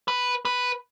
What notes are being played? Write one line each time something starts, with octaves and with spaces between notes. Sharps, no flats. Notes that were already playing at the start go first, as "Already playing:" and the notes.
B4
B4